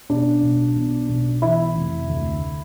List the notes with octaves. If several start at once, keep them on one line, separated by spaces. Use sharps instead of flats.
B2 D4
B1
B2
B1
E3 E4
F1
D2